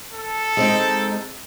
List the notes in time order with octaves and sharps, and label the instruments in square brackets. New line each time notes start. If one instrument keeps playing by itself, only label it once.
[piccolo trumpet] A4
[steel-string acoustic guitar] G#3 C4 D#4